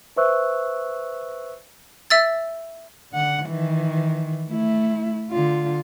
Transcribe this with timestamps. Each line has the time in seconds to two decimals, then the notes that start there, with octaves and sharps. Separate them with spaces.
0.16 B4 C5 E5 C#6 E6 F#6
2.10 E5 E6 A6
3.12 D3 F#5
3.45 D#3 E3
4.48 A3 E4
5.30 D3 F4